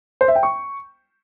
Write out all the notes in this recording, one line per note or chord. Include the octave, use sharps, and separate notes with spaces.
C5
E5
G5
C#6